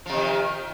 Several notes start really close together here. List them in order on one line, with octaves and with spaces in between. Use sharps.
F3 C3 D#3